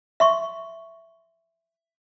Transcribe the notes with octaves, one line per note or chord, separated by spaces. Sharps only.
E5 C6 C#6